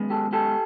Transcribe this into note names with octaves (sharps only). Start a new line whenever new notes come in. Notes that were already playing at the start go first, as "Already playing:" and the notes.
Already playing: F#2 D#3 G#3 B3
G4 A4
G4 A4